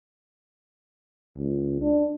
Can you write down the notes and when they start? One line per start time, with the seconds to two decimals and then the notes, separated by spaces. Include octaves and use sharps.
1.38 C#2
1.81 D4